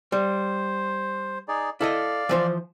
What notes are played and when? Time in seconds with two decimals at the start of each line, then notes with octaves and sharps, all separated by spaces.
0.12 G3 C5
1.48 D#4 G#4 D5
1.81 E4 A4 D5 D#5 F5
2.29 E3 F3 C5